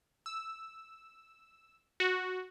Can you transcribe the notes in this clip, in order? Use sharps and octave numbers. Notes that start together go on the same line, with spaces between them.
E6
F#4